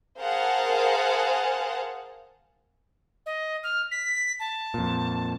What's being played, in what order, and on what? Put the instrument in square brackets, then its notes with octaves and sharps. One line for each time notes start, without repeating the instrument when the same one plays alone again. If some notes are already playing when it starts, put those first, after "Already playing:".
[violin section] G#4 A#4 C5 F5 F#5 A5
[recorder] D#5
F6
B6
A5
[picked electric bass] F2 A#2